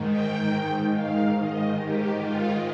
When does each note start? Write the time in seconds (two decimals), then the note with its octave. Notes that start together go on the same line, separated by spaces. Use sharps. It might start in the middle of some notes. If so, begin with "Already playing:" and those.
Already playing: G#2 D#3
0.10 G5
0.94 F5
1.36 G#2 D#3 D#5
1.79 G4
2.20 F4